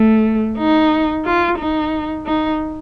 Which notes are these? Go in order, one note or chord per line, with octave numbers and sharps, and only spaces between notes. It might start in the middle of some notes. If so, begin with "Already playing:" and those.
Already playing: A3
D#4
F4
D#4
D#4